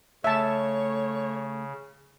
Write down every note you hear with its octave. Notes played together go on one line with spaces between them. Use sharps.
C#3 A3 C#5 E5 A5